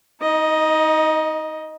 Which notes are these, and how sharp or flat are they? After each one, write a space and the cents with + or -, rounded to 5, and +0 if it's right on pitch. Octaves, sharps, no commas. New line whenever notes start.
D#4 +30 D#5 +0